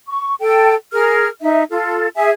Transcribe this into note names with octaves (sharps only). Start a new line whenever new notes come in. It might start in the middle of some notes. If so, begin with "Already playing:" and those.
C#6
A4 G5
G#4 A#4 F6
D#4 E5
F4 A4
G#4 E5 G#5